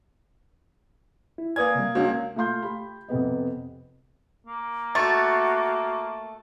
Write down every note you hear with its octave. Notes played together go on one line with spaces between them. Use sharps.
E4
A#3 B4 D5 G#5 D#6 G#6
C3 G3
C#2 A#3 C#4 D4 F#4
A3 F4 F5 C6 G6
G4 B5
F2 C3 B3 D#5
A#3
A3 F#4 C#6 A6